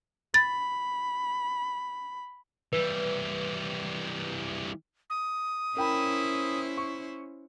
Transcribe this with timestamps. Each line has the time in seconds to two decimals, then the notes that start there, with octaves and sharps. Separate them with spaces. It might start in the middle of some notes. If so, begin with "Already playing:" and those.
0.34 B5 A6
2.73 E3 G3 B4
5.10 D#6
5.77 C#4 E4 A#4 C5 G5 B5
6.77 C#6